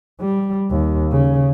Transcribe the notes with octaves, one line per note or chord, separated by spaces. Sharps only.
G3
D#2
C#3